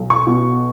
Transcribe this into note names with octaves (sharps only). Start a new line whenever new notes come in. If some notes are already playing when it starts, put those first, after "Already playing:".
Already playing: B1
C#6
B2